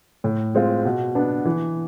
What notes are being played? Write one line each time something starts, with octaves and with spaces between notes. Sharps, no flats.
A2
G#3 C4 F4
B2
B3 D4
E3